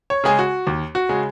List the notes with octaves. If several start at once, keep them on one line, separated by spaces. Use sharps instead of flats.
C#5
C#3 G#3 G#4
F#4
D#2
F#4
C#3 G#3